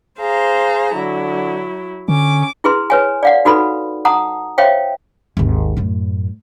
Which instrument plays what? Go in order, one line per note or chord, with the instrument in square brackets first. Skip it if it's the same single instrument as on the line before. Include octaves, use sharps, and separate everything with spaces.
[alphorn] G#4 [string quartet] C5 F5 A#5
[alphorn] D3 [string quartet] F#3 E4
[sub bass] D3 [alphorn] C#4 [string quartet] D6
[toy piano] E4 G#4 B4 C6
B4 C#5 G#5
D5 F5 F#5
D#4 F#4 A4 B4 B5
F#5 A5 A#5 D#6
C5 C#5 E5 F5 G5
[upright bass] G#1 D#2
F#2 A2